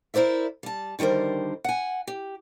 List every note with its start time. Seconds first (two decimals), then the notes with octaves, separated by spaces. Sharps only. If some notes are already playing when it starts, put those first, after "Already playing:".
0.14 E4 A#4 C5 D5 E5
0.63 G3 A5
0.99 D3 D#3 G3 A#4 C5
1.64 F#5 G#5
2.07 G4